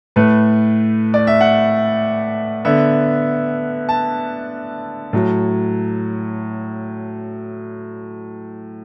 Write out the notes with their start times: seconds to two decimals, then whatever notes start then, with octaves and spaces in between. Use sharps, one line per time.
0.16 A2 A3 B4
1.14 D5
1.27 E5
1.41 F#5
2.65 D3 B3 E5
3.89 A5
5.13 A2 F#3